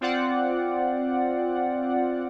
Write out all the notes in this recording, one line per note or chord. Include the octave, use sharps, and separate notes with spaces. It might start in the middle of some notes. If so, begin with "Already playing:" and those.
C4 F4 D5 F#5